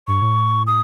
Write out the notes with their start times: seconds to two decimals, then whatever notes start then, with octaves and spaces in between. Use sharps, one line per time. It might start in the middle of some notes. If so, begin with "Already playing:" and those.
0.08 G2 C#6
0.22 A2
0.67 D#6